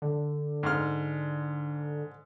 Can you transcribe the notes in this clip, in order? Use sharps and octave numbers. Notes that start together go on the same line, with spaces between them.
D3
G#2 F6